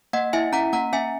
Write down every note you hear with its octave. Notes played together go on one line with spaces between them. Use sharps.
A#3 D#5 F#5
E4 E5 G#5
C#4 F#5 A#5
A#3 F#5 A#5
C#4 E5 G#5